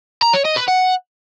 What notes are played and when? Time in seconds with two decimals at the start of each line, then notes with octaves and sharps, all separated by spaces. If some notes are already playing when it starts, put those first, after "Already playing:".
0.22 A#5
0.34 C#5
0.45 D#5
0.57 B4
0.68 F#5